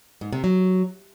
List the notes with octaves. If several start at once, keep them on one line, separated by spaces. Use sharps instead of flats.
G#2
C3
F#3